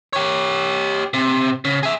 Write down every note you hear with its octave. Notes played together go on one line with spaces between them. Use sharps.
G4 C#5
C3
C#3
G#4 E5